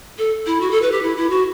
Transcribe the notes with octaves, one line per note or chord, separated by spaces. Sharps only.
A4
E4
F#4
A4
B4
G4
E4
E4
F#4